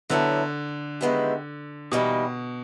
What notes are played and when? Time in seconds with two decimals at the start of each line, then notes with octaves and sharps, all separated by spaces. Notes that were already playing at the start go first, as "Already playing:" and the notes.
0.10 D3 F#3 B3 E4 A4 C#5
1.01 D#3 G#3 B3 E4 G4
1.91 B2 E3 G3 A#3 D#4 G4